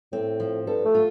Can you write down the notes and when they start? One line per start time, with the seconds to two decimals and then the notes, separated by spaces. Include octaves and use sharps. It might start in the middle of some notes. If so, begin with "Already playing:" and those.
0.12 A2 C4
0.40 F3
0.67 G2 A4
0.85 A3
0.95 F4